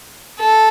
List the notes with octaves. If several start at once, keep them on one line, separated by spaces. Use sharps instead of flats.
A4